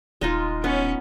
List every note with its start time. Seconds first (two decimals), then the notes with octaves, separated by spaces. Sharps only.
0.21 D#1 G#3 D#4 F4
0.64 B3 C#4